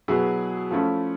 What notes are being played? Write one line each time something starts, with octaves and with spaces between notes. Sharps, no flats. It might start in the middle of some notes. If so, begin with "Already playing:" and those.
B2 F#3 B3 E4 G#4
F3 A3 C#4 E4